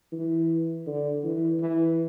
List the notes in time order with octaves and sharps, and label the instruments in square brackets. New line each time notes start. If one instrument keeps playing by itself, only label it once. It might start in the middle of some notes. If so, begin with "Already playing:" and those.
[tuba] E3
D3
E3
E3